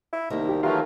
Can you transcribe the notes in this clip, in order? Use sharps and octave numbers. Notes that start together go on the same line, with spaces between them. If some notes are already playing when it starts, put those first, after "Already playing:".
E4
C2 D#3 A#3
G4
E3 F#3 A3 F4 G4 A#4 F5